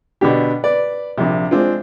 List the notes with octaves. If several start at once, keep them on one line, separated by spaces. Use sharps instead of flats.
B2 D3 D4 G4
B4 D5
A#1 C3
G#3 C4 D4 F4